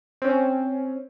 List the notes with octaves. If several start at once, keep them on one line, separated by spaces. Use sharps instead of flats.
C4 C#4